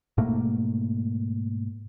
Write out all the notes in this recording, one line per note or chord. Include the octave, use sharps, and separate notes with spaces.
G#2 B2 A3 A#3